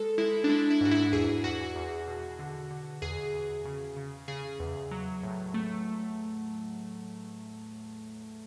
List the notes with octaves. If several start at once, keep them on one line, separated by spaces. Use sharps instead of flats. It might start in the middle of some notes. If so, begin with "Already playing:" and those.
Already playing: G#3 A4
G#3 E4
D4
G#3 E4
E4
G#2 F#4
E4
E2 G#4
E2 F#4
E2
B2
D3
D3
E2 G#4
E2
C#3
C#3
C#3 G#4
E2
F#3
A2
A3